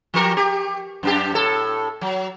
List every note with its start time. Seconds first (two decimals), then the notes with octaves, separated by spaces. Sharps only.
0.14 F3 G4 A#4
0.37 G4
1.03 F#2 D4 G4
1.32 A2 A4
2.01 F#3